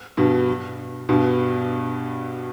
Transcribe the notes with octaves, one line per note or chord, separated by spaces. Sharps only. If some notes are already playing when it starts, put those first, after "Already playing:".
G2 B2
G2 B2